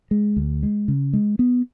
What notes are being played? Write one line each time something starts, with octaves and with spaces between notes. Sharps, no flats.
G#3
D2
G#3
C#3
G#3
B3